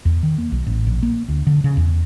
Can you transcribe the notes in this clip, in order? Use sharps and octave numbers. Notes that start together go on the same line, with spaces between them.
E2
D#3
A#3
B1
A1
A#1
A#3
D2
D3
C#3
E2